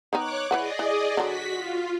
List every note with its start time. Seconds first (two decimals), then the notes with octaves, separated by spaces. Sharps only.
0.13 D#3 B3 D#4 C#5 D6 F#6
0.51 E3 G#4 B4 D5 D#5 F#5
0.79 E3
1.17 D3 F#3 F#4 B6
1.52 F4